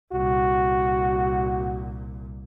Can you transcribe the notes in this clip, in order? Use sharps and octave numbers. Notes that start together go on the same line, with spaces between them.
C2 A#2 F#4